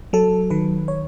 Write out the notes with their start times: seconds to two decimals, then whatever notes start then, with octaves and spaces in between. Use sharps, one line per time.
0.13 F#3 A4
0.50 D#3 B4
0.88 C#5